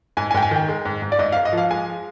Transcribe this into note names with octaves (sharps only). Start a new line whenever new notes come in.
G#2 G#5
G#5
G#2 G5
G#5
D#3 G5
G#3
G#2
G#2
D5
G#2 D#5
F5
G#2
D#5
F3 F5
G#3 G#5